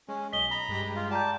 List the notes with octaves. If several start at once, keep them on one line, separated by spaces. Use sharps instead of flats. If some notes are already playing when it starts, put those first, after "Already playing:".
G#3 C#4
B1 D#5 B6 G7
A#5 B5
G2 G#3 G4
F4
D5 G5 A5 A#5 G6